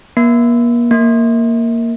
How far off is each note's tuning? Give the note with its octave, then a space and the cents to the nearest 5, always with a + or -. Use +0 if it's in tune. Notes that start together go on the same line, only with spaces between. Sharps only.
A#3 +40
A#3 -5